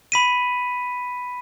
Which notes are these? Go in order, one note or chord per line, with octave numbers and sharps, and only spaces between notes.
B5 B6 D#7